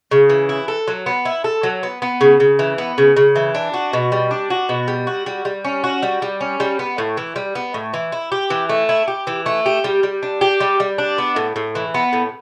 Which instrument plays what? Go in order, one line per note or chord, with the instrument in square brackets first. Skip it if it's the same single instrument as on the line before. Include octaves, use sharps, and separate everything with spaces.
[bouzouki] C#3
E3
E4
A4
F#3
B3
E4
A4
F#3
B3
B3
C#3
C#3
E3
B3
C#3
C#3
E3
D4
F#4
B2
G3
D4
F#4
B2
G3
F#4
G3
G3
C#4
F#4
G3
G3
C#4
G3
B3
A2
E3
G3
B3
A2
E3
E4
G4
E3
A3
E4
G4
E3
A3
G4
G3
G3
D4
G4
G3
G3
D4
B3
A2
A2
E3
B3
A2